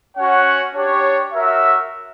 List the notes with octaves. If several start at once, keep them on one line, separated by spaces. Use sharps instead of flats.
C#4 F#4 C#5 F#5
D4 G4 C#5
F#4 A#4 C#5 E5